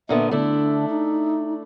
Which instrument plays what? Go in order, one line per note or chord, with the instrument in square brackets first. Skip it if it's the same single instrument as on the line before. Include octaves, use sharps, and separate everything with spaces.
[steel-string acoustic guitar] A#2 D3 B3 [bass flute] E5
[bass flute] D3 [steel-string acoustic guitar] A3 D4 E4
[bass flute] D#4